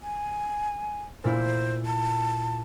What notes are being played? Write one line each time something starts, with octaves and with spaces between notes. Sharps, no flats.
G#5
A#2 A#3 E4 C5
A5